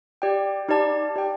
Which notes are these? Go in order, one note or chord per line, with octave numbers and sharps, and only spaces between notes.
G4 D5 G5
D#4 G4 D5 A5
G4 D5 G5